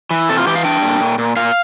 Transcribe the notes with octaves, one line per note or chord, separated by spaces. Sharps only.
E3
C3 A4
F4
E3 G4
F5
D4 G5
A#2
A#2
A#2
A#2 F5